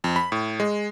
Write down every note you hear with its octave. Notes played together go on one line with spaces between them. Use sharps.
F2
B5
A2
G#3